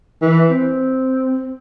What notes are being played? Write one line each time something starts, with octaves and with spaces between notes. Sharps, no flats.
E3
C4